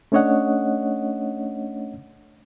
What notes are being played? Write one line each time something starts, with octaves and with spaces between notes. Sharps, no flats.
A3 C#4 D4 C#5 D#5 F#5